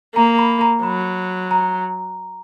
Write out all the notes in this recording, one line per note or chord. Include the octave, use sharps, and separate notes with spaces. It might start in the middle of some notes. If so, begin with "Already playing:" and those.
A#3 A#5
B5
A#5
F#3 B5
A#5